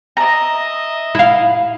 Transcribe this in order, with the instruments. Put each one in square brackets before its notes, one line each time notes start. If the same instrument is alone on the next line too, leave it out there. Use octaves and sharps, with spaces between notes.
[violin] D#5 E5 [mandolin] A#5
[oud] E4 F5